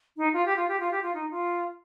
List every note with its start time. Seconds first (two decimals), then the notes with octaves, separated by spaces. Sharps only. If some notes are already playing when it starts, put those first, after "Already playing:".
0.17 D#4
0.33 F4
0.46 G4
0.56 F4
0.68 G4
0.80 F4
0.91 G4
1.02 F4
1.14 D#4
1.31 F4